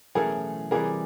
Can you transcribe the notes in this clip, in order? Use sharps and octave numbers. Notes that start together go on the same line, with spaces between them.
B1 A2 E3 A3 C#4 G#4 A#4
C3 E3 G3 G#4 A#4